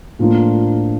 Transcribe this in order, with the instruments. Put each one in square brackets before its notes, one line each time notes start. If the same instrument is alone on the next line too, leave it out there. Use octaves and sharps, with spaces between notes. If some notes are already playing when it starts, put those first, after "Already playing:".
[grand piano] A2 F3 A#3 D4 F4